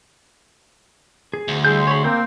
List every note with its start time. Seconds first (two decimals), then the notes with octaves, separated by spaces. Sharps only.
1.34 G#4
1.48 D2
1.65 G3 E4 G#4 C6 G6
1.87 C#5 B5
2.04 A#3 C4 A#4 G5